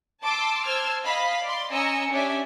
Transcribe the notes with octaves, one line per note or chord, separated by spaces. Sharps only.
A5 C6 D6 E6
C5 A5 E6 F6 G#6
D#5 F5 B5
D5 C6
C#4 D#5 G#5 A#5 E6 C#7
C#4 D4 G4 D5 E5 G#5